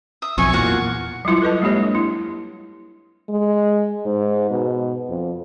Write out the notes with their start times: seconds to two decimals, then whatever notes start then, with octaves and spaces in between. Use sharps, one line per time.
0.22 E5 D#6
0.38 B1 F2 C#5 E5 G#5 C#6
0.53 E2 A#2 F#4 F5 F#5
1.25 F#3 G3 E4 F4
1.42 A4 B4 D#5 A5
1.62 G#3 A#3 D4 G4 C#5
1.95 E4
3.29 G#3
4.05 G#2
4.51 B2
5.09 F2